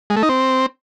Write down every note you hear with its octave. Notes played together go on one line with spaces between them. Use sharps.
G#3
A3
D#4
C4